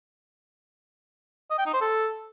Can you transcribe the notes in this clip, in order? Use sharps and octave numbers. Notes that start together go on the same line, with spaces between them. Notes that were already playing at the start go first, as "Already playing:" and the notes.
D#5
G5
D#4
C5
A4